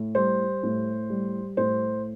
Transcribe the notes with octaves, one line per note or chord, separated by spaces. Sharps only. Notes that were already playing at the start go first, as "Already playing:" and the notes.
Already playing: A2
G3 C5
A2
G3
A2 C5